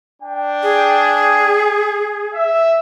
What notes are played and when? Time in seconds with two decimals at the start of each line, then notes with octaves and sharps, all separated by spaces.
0.21 D4 G5
0.63 G#4
2.34 E5